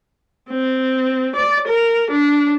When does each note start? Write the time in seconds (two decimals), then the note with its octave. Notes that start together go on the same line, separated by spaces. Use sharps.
0.50 C4
1.36 D5
1.68 A#4
2.11 D4